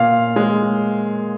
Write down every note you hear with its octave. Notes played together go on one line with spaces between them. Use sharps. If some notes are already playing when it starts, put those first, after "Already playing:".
Already playing: A#2 F5
G#3